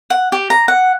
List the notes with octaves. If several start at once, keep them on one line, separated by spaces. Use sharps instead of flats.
F#5
G4
A#5
F#5